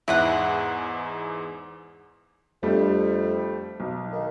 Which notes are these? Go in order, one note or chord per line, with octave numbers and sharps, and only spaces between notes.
E2 G#2 E4 B4 F#5
F2 G3 A3 D4
B1
D#3